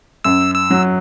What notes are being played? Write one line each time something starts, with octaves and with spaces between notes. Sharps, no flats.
F#2 E6
E6
F#3